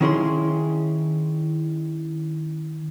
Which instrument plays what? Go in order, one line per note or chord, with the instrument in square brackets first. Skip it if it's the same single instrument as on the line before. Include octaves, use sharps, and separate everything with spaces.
[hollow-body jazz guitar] D#3 C#4 E4 G#4 C6